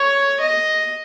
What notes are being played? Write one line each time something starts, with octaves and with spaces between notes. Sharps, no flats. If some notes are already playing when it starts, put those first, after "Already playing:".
Already playing: C#5
D#5